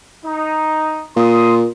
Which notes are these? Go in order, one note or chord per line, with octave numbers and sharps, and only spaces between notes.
D#4
A#2 C6 D#6